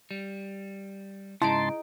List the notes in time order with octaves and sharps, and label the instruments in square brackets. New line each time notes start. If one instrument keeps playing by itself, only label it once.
[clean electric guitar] G3
[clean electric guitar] G#2 C#3 [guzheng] D#4 G#4 [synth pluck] E4 D7 [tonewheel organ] A5 C6